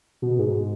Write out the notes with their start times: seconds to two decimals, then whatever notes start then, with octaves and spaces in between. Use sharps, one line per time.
0.22 B2
0.39 G#2